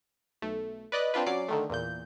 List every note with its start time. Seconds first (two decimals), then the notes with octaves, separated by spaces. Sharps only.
0.42 B1 A3
0.92 B4 D5 D#5 F#6
1.14 C4 D4 F4 B4
1.26 F#3 C#4 D5 D6 C7
1.48 D3 D#3 A3
1.69 E2 A#2 G6